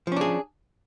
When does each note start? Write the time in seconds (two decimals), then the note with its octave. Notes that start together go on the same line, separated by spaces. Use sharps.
0.07 F3
0.12 C#4
0.16 D4
0.21 G#4